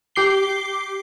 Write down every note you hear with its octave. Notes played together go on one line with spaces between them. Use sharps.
G4 D6 C7 G7